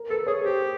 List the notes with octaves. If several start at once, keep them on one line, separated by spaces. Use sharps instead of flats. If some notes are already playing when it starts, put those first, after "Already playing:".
Already playing: A#4
A4 B4
G#4 C#5
G4 C5